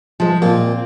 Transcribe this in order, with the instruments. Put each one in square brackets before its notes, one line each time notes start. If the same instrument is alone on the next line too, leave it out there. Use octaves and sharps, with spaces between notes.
[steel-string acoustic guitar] F3 G#3
[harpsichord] A#2 [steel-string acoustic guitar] C4